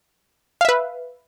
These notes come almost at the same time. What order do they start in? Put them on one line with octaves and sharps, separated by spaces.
F5 E5 B4